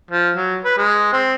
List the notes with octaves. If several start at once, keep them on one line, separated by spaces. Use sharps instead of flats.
F3
F#3
B4
G#3
C4